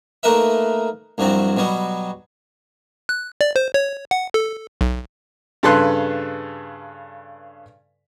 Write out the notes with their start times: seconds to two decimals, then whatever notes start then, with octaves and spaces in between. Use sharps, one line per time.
0.23 A3 A#3 D#4 A#4 B4 E5
1.18 C2 G2 F3 F#3 C4
1.57 B2 F#3 G3 B3
3.09 F#6
3.41 D5
3.56 C5
3.74 C#5
4.11 F#5
4.34 A4
4.81 B1
5.63 G2 C#3 A4 B4 C6 F#6